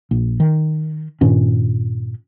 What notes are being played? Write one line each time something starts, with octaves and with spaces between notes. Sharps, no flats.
A#1
D#3
G2 A#2 D#3 C#4